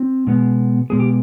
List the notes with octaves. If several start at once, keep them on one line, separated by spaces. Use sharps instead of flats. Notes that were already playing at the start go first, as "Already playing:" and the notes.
Already playing: C4
B2 G#3 B3
B2 G#3 B3 G#4
G4